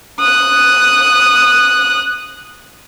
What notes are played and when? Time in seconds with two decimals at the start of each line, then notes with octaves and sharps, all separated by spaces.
0.20 D#6 F#6